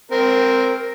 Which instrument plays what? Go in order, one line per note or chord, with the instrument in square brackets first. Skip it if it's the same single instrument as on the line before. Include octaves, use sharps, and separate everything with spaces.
[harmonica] C4 A#4